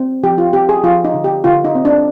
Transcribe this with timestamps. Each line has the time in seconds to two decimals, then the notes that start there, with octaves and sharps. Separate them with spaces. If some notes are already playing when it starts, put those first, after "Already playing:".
Already playing: C4
0.23 F3 G4
0.38 F4
0.53 C4 G4
0.69 G#4
0.84 F3 F4
1.04 D#4
1.14 D3
1.24 G4
1.44 D3 F4
1.65 D#4
1.75 C4
1.85 D4